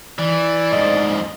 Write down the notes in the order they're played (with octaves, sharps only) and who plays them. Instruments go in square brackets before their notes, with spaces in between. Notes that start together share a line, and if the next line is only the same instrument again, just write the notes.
[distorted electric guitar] E3 [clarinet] D5
[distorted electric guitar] F2 G#2 [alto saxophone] D#5